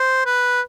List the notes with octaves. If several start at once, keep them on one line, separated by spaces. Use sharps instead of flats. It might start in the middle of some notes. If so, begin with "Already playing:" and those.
Already playing: C5
B4